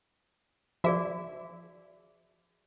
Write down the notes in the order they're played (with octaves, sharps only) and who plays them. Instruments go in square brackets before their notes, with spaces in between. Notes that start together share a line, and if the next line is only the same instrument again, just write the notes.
[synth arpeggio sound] F3 E5 [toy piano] F#4 G#4 D5